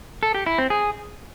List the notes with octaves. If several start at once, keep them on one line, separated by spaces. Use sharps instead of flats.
A4
G4
E4
C4
G#4